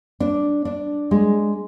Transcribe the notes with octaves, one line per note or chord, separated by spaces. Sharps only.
D4
D4
G#3